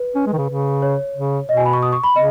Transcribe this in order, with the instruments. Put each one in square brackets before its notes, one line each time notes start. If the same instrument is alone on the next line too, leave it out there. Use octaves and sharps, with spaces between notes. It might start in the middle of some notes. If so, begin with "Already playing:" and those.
Already playing: [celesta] B4
[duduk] C#4
G#3
D#3
C#3
C#3
[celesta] C#5
[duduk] C#3
[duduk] B2 [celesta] D#5
[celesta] G#5
B5
C#6
D#6
C#6
B5
[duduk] C#3 [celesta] D#5